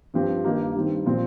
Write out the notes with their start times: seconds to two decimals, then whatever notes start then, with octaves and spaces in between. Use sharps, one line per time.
0.14 G2 F3 C4 G4
0.44 G2 D#3 A#3 D#4 G4
0.74 G2 D#3 G3 C4
1.06 A#2 F3 C4